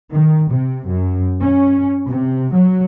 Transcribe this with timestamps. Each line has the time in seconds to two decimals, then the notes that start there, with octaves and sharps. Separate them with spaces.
0.13 D#3
0.51 C3
0.88 F#2
1.41 C#4
2.08 C3
2.54 F#3